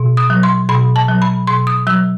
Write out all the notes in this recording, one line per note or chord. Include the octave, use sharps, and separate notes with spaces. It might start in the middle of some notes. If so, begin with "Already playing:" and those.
Already playing: B2
D#6
F#3
C6
B2 B5
A5
F#3
B5
B2 C6
D#6
F#3 E6